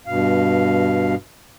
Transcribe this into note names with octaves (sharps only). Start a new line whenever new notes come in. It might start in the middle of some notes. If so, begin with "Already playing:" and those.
G2 B2 F5